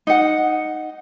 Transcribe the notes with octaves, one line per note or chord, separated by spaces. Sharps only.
D#4 F#5